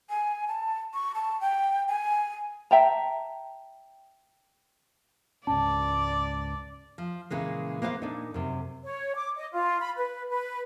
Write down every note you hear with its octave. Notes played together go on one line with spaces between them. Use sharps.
G#5
A5
C#6
A5
G5
G#5
E5 G5 A5 A#5
C#2 G#2 C#4 D5 A5
F3
A#2 C#3 E3 G#3
A#3 B3 C5 C#5 F5
A#2 D4 D#4
F#2 C3
C#5
D6
D#5
F4
B5
B4
B4